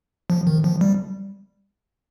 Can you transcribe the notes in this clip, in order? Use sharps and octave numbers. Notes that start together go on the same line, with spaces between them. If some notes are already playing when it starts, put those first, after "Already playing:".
F3
D#3
F3
G3